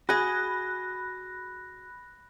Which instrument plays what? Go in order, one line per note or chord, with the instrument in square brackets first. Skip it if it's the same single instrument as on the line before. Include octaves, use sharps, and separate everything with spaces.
[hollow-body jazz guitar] F#4 G#4 [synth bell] B5 F#6 A#6